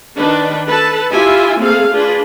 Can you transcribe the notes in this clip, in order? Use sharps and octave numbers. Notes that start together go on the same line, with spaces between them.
D#3 D4 B4
A4 B4 A5
E4 F4 G4 E5 G#5
A3 A#3 C4 G#4 A4 F5
D4 F4 G#4 B4